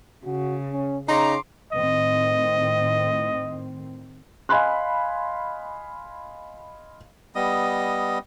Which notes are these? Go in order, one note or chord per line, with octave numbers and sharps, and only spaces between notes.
C#3 F#4
C#4
C#3 D#4 A#5 C6 D6
A2 D#3 C4 D#5
D#5 F5 G#5 B5 C6 F#6
G3 B3 D#5 D#6